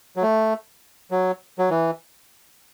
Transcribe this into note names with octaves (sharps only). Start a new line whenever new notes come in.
F#3
A3
F#3
F#3
E3